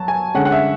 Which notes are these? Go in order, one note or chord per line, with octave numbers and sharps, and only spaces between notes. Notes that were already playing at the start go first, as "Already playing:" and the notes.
Already playing: F#3 A5
G#5
D3 G#3 C#4 F#5
F#5
E5